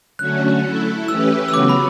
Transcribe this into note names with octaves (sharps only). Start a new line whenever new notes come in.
D3 F#3 A3 C#4 F#4 F#6
A3 E4 A4
E3 A3 C#4 G4 B4 E6
E6
C#3 F#3 B3 F#4 D6
B5